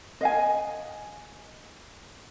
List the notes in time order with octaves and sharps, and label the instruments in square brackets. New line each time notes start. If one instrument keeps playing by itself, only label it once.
[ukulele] D#5 F5 G#5